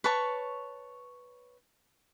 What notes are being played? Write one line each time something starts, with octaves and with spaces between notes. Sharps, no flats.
B4 C#5 A5 C#6